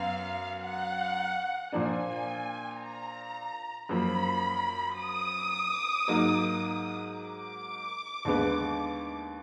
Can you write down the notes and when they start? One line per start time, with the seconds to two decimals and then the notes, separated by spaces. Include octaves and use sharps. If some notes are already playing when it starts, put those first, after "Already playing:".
Already playing: F#2 B3 F5
0.63 F#5
1.72 A#2 F3 A#3 D4 G#5
2.81 A#5
3.89 F#2 F3 A#3 B5
4.99 D#6
6.08 G#2 F#3 A#3 D#4
7.16 D6
8.25 D#2 D3 G#3 B3